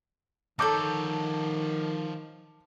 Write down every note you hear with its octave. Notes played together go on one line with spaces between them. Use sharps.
D#3 F3 D#4 A4 C#5 A5 D6 G6